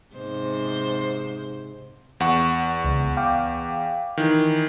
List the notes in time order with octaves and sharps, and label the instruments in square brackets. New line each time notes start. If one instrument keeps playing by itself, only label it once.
[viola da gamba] G#2 C3 C5
[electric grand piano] E2 F#5 C#6
[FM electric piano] C#2
F5 G5 D6
[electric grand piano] D#3 E3